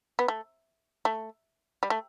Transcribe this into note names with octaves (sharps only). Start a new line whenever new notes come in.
B3
A3
A3
G3
A3